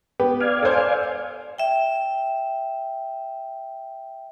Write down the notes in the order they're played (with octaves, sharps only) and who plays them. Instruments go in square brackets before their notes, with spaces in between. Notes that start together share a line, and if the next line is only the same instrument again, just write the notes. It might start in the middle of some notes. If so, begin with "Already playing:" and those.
[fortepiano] B3 G4
[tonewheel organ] D5 F5 G#5
[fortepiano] A4 C5
[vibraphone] E5 G5